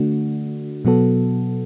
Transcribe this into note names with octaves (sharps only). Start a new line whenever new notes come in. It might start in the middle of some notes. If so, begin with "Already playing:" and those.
Already playing: D3 A3 D4 F#4
B2 F#3 B3 F#4 A4